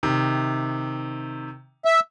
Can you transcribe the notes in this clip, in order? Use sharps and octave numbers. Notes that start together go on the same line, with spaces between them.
C3 D#3
E5